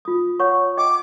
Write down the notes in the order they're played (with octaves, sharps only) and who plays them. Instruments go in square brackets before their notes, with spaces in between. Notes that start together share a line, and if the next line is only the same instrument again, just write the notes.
[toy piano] F4 D#6
C#5 F#5 C#6
[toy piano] D#5 G5 [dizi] D6